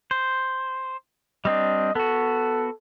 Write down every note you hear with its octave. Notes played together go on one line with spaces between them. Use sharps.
C5
G3 C4 D4 D#5
B3 F#4 A4